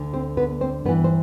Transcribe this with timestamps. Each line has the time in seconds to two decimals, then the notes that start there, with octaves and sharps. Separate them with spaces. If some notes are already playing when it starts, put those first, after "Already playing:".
Already playing: D2 D3
0.13 C4 C5
0.37 B3 B4
0.61 C4 C5
0.85 G2 E3 B3 B4
1.04 C5